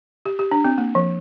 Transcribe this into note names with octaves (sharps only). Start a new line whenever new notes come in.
G4
G4
D4
C4
A#3
F3